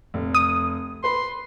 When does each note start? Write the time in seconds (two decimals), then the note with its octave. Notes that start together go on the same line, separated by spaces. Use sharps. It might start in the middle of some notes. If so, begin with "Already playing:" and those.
0.14 F1
0.35 D#6
1.04 B4 B5 C6